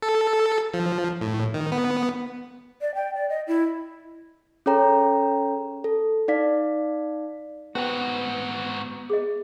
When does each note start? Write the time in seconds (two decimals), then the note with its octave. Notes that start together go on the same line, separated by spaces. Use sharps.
0.02 A4
0.74 F3
1.21 A2
1.54 D#3
1.72 B3
2.81 D5
2.95 G5
3.15 D5
3.29 D#5
3.47 E4
4.66 C#4 G#4 A4 C#5 G5 A#5
5.84 A4
6.28 D#4 D5 F5 B6
7.75 G#2 B3 C#4 D#4 F#4 C5
9.10 G#4 D#5